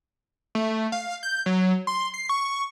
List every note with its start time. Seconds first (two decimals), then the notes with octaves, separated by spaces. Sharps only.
0.55 A3
0.92 F5
1.23 G6
1.46 F#3
1.87 C6
2.14 C7
2.29 C#6